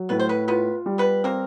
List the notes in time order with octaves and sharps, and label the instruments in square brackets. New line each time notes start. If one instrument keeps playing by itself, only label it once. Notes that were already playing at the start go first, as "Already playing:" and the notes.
Already playing: [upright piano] F#3
[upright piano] A2 [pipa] B3 B4
[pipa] C5
B3 B4
[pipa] B3 B4 [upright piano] F4
[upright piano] G3
[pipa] B3 B4
[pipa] A#3 A#4 [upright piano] C4